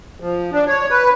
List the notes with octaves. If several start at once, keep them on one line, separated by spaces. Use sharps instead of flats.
F3
D4
C#5
B4